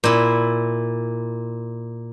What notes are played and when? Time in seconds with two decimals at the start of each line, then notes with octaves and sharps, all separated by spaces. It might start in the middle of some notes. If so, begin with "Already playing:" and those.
0.04 A#2 E4